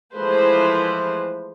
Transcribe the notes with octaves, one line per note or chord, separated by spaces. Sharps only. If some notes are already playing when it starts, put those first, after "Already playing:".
E3 F3 G#3 A3 B4 C5